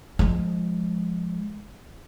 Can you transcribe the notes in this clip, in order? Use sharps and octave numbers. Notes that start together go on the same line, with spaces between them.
F3 G#3